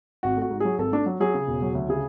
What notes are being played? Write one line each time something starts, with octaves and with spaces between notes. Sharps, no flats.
G#1 F#4
A3
F#4
G#2
F#3 G#4
G#1 A4
A3 D4
F#3
F#3 G#4
C#3
E1
F#3
D2
C#3 G#4